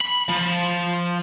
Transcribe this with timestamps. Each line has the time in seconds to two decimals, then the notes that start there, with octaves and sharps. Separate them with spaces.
0.01 B5
0.29 F3